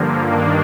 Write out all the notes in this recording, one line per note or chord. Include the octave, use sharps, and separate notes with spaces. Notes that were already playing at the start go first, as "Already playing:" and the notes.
Already playing: G2 D3 F3 A#3
G2 D#3 A#3 D4